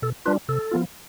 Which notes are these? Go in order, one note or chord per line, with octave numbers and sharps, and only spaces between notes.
B2 A4
G3 D4 F4 B4
C3 A4
F3 B3 F4